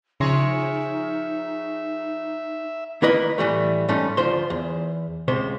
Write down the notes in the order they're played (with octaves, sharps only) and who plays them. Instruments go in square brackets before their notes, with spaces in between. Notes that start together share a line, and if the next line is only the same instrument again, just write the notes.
[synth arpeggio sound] C#3 C6 A#6 [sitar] F3 G#4 C#5 [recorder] D#4 [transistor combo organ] E5
[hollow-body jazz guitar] D#3 A#3 E4 B4 D#5 B5
A2 E3 G3 A3
G#2 G3 A3 C#4
D2 F3 C5 C6
E2
C#2 C3 C5